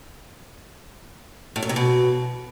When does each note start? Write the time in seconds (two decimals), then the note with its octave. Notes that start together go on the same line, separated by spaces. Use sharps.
1.56 A2
1.63 F#2
1.69 C3
1.76 B2